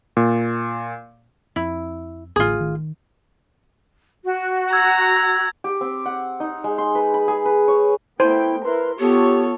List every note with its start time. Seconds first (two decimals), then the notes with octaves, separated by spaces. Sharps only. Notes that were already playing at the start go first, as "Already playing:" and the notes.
0.17 A#2
1.56 F2 C4 E4
2.36 A1 D2 A2 F4 G#4
2.60 D#3
4.24 F#4
4.73 A#5 E6 G#6
5.64 G4
5.81 C4
6.06 F#5
6.40 D#4
6.64 G#3
6.78 C6
6.95 B4
7.14 B5
7.28 G#4
7.45 B4
7.68 C#5
8.20 A3 B3 E4 C5 G5
8.64 E4 A#4 B4 C6
8.99 B3 F4 G4 A4 C#5